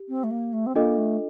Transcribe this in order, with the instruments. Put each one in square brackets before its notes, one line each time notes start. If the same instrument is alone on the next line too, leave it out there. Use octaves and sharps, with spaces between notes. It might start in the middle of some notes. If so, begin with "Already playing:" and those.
Already playing: [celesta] G4
[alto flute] C4
A3
A#3
A3
C4
[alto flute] A#3 [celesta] D4 F4 A4 D#5
[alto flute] A3